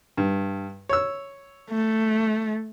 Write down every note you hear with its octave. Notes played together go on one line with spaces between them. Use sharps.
G2
C#5 E6
A3